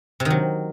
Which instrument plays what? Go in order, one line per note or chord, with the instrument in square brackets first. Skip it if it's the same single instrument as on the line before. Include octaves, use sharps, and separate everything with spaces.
[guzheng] C3
D#3
F#3